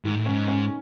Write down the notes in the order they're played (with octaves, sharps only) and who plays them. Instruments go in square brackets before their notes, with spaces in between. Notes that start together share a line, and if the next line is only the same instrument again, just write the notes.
[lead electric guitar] G#2 [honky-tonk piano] D#3
[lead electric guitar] A2
[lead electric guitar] G#2 [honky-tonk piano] C#4
[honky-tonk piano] C#4